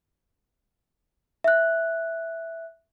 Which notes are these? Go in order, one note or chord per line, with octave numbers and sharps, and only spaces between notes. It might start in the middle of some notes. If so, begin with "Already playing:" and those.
E5 F#6